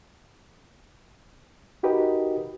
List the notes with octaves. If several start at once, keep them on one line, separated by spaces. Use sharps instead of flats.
D#4 F#4 G4 A#4 B4 D#5